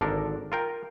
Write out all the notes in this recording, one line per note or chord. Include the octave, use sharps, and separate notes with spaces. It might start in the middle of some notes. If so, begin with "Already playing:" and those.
G#1 D3 D4 A4 A#4
F4 A#4 G5